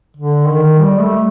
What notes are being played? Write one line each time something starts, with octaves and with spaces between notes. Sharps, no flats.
D3
D#3
G3
A3